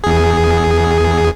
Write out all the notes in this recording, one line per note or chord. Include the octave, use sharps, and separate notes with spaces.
E2 G#4